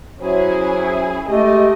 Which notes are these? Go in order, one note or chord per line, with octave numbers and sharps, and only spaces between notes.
F#3 C#4 E4 G#4 C5
G#3 A3 G4 D#5